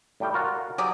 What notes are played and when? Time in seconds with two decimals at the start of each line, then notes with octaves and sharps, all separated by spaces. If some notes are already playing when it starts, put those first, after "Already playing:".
0.20 A2 G3 G5
0.34 F4 F#4 A#4
0.78 F#3 G4 G#4 D5